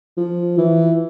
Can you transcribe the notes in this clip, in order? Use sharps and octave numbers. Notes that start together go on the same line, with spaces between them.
F3
E3